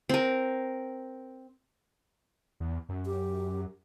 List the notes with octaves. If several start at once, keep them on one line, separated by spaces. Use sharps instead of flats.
C4 A#4
E2
F#2
G4